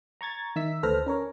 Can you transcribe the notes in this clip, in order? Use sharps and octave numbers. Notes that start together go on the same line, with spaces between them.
A#5 C#6 G#6 A6
D#3 D#4 E5 E6 B6
D2 A4 B4 C5 F6 A#6
C#4 A#4 C#5